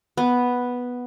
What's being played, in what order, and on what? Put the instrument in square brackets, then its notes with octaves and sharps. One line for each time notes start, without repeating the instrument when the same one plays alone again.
[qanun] B3